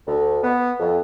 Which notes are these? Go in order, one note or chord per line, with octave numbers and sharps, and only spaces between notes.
D2
B3
F2